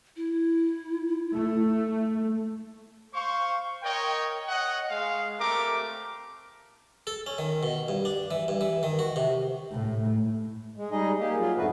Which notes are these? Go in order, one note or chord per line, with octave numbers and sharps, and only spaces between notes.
E4
A3
C5 F5 C#6
A#4 C#5 D#5 G5
C#5 D#5 F#5
G#3 F5
A3 C4 G4 A#4 D6
A4
C#4
D#3
B2
G2
D4
E3
G2
E3
D#3
F#4
C3
A2
G#3
G3 D#4 G#4 D#5
A#3 G4 G#4
F#3 F4 G#4
F2 G#2 D3 A3 F#4 B4